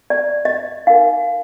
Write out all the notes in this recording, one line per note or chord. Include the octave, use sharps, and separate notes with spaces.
D5
D#5
D#4 A#4 F5